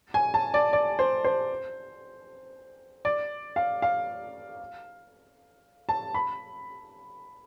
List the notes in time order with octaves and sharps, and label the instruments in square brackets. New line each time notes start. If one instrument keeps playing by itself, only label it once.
[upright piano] G#5
A5
D5
D5
C5
C5
D5
F5
F5
A5
B5